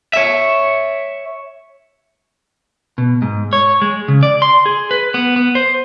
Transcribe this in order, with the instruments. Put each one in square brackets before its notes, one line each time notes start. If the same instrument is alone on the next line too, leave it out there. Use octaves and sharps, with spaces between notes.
[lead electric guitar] C#5 E5
[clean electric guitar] B2
G#2
C#5
G#3
C#3
D5
C6
G#4
B4
B3
B3
C5